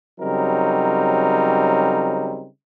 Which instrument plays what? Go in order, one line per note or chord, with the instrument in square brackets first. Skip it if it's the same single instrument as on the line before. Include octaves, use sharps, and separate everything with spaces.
[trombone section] C#3 F#3 G3 C4 D#4 A#4